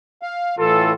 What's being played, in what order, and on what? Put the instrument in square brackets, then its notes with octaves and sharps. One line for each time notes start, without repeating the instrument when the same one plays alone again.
[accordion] F5
[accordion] A2 E3 [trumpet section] F4 A4